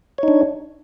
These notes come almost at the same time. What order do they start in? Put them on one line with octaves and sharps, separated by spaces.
C#5 D#4 D4